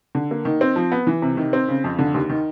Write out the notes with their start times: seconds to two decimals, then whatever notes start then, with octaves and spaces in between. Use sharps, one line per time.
0.15 D3
0.31 A#3
0.45 D#3
0.61 C4
0.76 F3
0.92 B3
1.07 E3
1.22 C3
1.37 D#3
1.53 C4
1.68 C#3
1.84 F2
1.99 D3
2.14 D#2
2.30 D#3